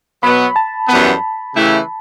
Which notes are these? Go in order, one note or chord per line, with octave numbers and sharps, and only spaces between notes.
B2 F#3 B3 B5
A5
F#2 E3 G3 B3 B5
C#3 E3 A3 E4 G4